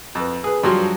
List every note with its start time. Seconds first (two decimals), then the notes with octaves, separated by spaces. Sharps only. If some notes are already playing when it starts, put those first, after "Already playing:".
0.15 F2 B4
0.44 G#4 B4
0.63 G2 F3 F#3 F#4 C6